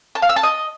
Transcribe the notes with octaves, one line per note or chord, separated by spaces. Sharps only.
A5
F5
E6
A5
D#5